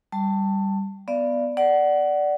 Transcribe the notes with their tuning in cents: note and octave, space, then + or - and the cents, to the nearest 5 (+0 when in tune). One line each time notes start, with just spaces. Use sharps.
G3 +0 A5 +15
B3 +0 D5 +0 F5 -35
D5 +0 F#5 +15